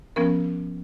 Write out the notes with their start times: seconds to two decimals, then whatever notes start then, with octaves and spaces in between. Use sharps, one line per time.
0.16 F3 B3 C#4 A#4